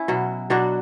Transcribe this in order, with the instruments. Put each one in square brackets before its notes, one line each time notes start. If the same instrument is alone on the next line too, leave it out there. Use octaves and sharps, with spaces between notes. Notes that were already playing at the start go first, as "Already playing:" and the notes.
Already playing: [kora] C#4 E4
B2 F#3
B2 F#3 D4 F#4